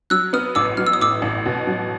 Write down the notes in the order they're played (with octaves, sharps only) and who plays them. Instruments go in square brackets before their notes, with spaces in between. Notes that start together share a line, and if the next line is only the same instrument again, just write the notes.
[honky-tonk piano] F#3 [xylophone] E6 F#6
[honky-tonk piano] B3 [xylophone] D#6 F6
[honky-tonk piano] A1 [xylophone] D6 E6
[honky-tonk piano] F#3 [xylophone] F6
[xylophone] E6
D#6
[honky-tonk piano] A2 [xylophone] D6 E6
[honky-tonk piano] A1
B2
F#3